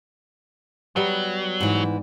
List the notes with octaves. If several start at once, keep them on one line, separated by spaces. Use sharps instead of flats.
F#3 G3 B3
G#2 E3